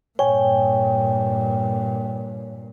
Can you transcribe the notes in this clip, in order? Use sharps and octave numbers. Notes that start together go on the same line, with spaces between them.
G2 A#2 C#5 G5 G#5